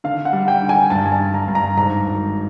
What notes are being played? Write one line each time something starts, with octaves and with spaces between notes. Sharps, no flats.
D3 F5
F#5
G3
G5
D3
G#5
G2 A5
G#5
A5
D3
A#5
G2
A#5
G#2 A#5
G#1